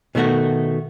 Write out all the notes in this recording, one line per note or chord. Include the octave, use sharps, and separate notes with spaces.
B2 D#3 A3 F#4